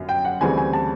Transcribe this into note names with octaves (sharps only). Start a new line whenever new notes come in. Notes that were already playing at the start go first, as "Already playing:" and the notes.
Already playing: G1 F#2
G5
F#5
D2 C#3 E3 G3 C4 G#5
G#5
A5